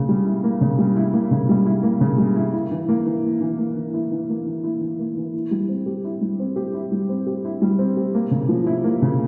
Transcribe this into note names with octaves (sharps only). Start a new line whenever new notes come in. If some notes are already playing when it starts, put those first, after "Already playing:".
Already playing: C#3 A#3
G3
E4
A#3
C#3
G3
E4
A#3
C#3
G3
E4
A#3
C#3
G3
E4
E4
E3
A#3
E3
E4
E3
A#3
E3
E4
E3
A#3
E3
E4
E3
A#3
E3
E4
G3
C4
G4
E4
G3
C4
G4
E4
G3
C4
G4
E4
G3
C4
G4
A#3
C#3
F3
E4
A#3
C#3